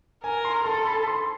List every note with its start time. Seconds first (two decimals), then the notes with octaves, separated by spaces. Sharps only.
0.23 A#4 G#5
0.45 C6
0.65 A4 C6
0.87 B5
1.08 C6